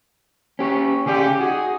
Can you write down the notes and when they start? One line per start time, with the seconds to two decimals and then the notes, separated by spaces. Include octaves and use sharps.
0.59 C#4 G4 C#5
1.06 C#3 G4 G#4 D5
1.40 D#4 F#4 G#4